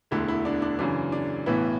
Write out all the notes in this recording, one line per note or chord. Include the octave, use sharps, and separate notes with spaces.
E1 D2 D3 E4
E4
D4
D4
F#2 C#3 E3 D4
D4
B1 A2 E3 B3 E4